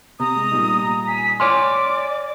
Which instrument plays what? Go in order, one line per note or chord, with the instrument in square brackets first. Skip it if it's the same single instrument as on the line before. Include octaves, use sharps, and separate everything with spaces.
[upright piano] C3 [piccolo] A#5 [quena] D#6
[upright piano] G#3
A#2 G3 D#4
[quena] G#5 [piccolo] B6
[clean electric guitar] C#5 G#5 C6 [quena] D5 [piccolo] D6 [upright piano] F6